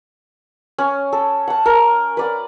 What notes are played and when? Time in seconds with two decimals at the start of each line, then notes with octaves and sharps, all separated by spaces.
0.78 C#4
1.13 A4
1.47 F#5 A5
1.66 A#4
2.17 B4 D5 F#5